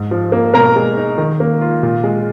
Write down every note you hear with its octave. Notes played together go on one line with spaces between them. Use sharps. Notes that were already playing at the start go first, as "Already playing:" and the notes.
Already playing: G#2
F3
A#3
B2 A#4 A#5
G#3
D#4
D#3
A#3
F4
A#2
G#3